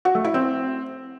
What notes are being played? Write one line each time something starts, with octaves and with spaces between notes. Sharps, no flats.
F#4
A3
E4
C4